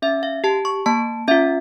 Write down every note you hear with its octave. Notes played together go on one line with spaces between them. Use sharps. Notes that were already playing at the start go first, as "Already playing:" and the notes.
C#4 E5
F5
G4 A5
C#6
A#3 A5
C#4 F4 E5